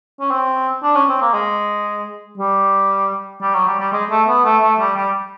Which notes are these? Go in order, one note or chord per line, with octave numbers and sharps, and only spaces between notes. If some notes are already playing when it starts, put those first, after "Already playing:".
C#4
C4
D4
C#4
C4
A#3
G#3
G3
G3
F#3
G3
G3
G#3
A3
B3
A3
A3
G3
G3